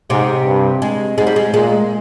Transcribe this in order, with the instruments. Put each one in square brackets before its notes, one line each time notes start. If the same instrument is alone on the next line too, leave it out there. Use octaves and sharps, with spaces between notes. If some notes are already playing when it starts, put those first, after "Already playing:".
[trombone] G#2 [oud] C3
[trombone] G2
[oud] G#3
[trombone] G#2 [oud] G#3
[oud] G3
G#3
[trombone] A#2 [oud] G#3